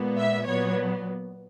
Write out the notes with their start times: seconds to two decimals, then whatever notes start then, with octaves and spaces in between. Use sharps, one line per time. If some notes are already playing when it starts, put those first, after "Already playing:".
Already playing: A#2 G#3 B3
0.18 E5
0.46 A#2 F#3 B3 C#5